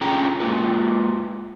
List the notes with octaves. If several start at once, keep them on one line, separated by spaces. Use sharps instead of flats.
D3 C#4 F4 G#4 G5 A#5
G#3 A#3 F4 B4